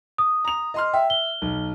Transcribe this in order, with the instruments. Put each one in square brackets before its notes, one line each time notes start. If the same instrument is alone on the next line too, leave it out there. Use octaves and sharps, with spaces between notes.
[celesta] D#6
[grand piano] A#5 F7
D#5 C6 F6
[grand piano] E5 [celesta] G5
[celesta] G7
[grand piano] B1